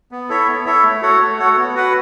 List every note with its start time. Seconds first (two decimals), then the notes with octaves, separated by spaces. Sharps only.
0.11 B3
0.29 E4 A4 C#5 E5
0.47 B3
0.66 E4 A4 C#5 E5
0.83 A3
1.02 F#4 A4 C#5 F#5
1.21 A3
1.39 F#4 A4 C#5 F#5
1.56 B3
1.74 F#4 B4 F#5